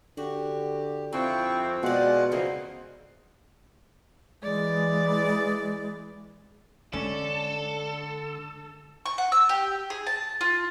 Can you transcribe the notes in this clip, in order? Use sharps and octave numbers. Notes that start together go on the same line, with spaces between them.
D3 F#4 G4
F2 C3 F3 C4 E4 G5 C#6
B2 G#3 F4 G#4 D5 F#5
F2 C#3 E3 A#3 C4 D#4
E3 G#3 D5
D3 G#3 C#4 D4 A4
C#6
F#5
E6
G4
G#4
A5
F4